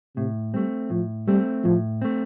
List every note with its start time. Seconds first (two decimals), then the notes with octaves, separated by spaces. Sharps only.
0.17 A2 C3
0.54 G3 A3 C4
0.90 A2 F3
1.28 G3 A3 C4
1.64 A2 F3
2.02 A3 C4